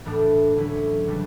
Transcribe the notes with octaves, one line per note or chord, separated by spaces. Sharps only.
A2 E3 B3 D4
D3 F#3 C#4 E4
C#3 E3 G3 B3 D4